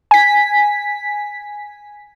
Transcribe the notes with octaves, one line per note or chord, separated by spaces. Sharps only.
G#5 B6